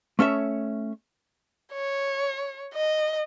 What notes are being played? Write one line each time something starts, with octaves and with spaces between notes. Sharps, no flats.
A3 C#4 C#5 E5
C#5
D#5